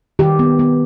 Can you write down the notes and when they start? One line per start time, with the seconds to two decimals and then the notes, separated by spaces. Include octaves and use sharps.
0.19 D#3 G4
0.39 B3
0.59 B3